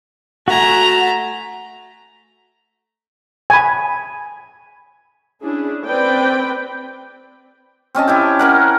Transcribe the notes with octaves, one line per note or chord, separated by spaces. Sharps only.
A3 F#4 G#5 A#5
G#5 B5
C#4 D4 E4 G#4
C4 B4 D5 G5 B5
C4 C#4 D#5 A5
E4 G4 G5
C#4 A#4 F#5